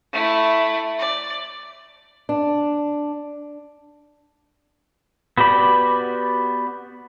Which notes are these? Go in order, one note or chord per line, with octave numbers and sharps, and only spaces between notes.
A3 E4
D5
D4
B3 F#4 G4 D5 B5